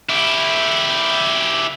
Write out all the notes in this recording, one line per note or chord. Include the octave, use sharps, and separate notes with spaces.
E4 G4